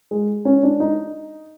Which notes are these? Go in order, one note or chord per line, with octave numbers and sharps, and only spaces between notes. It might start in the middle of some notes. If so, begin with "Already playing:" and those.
G#3
C#4
D4
D#4